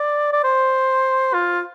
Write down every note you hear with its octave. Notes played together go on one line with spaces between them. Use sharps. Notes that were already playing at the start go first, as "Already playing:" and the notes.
Already playing: D5
D5
C5
F4